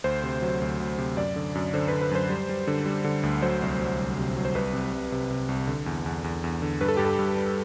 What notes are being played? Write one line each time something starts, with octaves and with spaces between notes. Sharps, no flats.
D2 C5
C3
F#3
D2
D2
C3
F#2 D5
D3
F#2
D3 C5
B4
D3
B4
F#2 C5
G3
G3
D3
G3
D3
D2
F#3 C5
C2
F#3
C2
C3
F#3
C5
C2 B4
C3
C2
C3
C3
C2
D3
E2
E2
E2
E2
D3
G2 B4
A4
G2 G4
A4
G2
G3